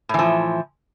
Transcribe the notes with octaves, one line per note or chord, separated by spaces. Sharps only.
A2 E3 F3